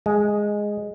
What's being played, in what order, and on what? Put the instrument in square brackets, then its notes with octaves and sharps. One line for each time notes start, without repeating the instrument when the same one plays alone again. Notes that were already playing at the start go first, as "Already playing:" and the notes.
[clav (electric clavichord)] G#3